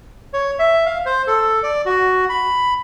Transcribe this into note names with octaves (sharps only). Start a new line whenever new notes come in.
C#5
E5
F5
C5
A4
D5
F#4
B5